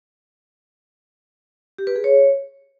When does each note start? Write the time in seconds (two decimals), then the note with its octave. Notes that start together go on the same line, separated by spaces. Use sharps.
1.78 G4
1.87 B4
1.96 G#4
2.04 C#5